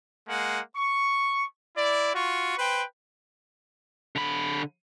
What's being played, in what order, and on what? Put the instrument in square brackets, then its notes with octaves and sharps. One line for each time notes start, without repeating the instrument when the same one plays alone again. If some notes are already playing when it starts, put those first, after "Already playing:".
[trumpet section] G#3 A#3 F#5
C#6
E4 D5
F4 F#4 C#6
B4 C5 G5
[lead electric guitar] D3 B5